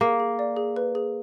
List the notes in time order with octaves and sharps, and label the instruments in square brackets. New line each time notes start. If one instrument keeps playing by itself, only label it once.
[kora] A#3 [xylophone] G#4
[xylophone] G#4
D5
G#4
B4
G#4